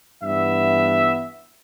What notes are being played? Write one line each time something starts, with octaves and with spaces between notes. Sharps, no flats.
G2 E3 B3 E5